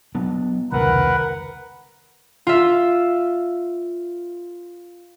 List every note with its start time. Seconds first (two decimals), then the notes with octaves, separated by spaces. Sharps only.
0.15 F#3 B3 D4
0.72 F1 C#2 D#3 A#4 B4 F#5
2.47 F4 E5